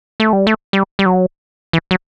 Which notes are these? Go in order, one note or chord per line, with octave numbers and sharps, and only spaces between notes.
A3
G3
A3
G3
G3
F#3
E3
F#3